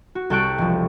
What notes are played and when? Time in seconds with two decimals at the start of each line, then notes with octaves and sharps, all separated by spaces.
0.15 F#4
0.30 C2 A4 G5 C#6 F#6 D7
0.58 E1 F3